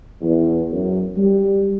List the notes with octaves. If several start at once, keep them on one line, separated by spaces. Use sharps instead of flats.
E2
F#2
G3